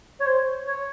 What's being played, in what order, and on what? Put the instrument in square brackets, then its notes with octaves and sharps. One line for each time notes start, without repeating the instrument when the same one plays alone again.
[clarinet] C#5
C5
C#5